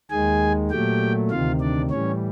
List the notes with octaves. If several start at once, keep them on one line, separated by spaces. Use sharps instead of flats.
D#2 D#3 G#3 G#4 G#5
A#2 F#3 A3 G4 G5
D2 C3 D#3 F4 F5
D4 D5
A2 E3 G3 C#4 C#5